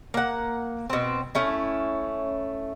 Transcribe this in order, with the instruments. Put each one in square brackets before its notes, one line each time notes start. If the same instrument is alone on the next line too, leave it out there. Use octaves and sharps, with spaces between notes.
[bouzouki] A#3 F#5
B2 C4
A3 C#4 E4